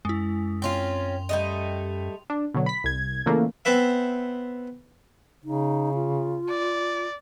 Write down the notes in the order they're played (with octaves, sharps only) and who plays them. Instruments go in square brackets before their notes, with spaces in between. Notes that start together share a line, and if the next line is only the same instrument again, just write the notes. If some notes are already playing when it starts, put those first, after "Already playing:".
[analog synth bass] F#2 [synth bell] G#3 E4
[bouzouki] C4 C#4 F4 [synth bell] G5 C6 F7
[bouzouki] G3 A3 D#5
[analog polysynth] D4
B2 D3 F#3
B5 B6
C2 G#6
A#2 C#3 E3 A3 A#3
[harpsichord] B3 C4 B4 E5
[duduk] C#3 [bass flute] D#4
[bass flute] F4
[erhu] D5